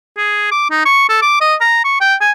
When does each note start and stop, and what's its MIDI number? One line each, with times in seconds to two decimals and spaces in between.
0.17 0.50 68
0.51 0.66 86
0.70 0.80 63
0.85 1.05 85
1.09 1.21 69
1.22 1.39 86
1.41 1.55 75
1.61 1.81 82
1.84 2.00 85
2.01 2.15 79
2.21 2.31 80